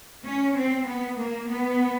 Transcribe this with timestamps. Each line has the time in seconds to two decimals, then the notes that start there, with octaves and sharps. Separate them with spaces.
0.24 C#4
0.56 C4
0.87 B3
1.19 A#3
1.50 B3